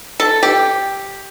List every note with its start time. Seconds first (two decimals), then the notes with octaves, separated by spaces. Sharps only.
0.20 A4
0.43 G4